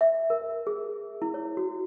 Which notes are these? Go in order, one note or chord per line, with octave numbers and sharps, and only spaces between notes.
E5
A#4
G#4
E4
C#5
F#4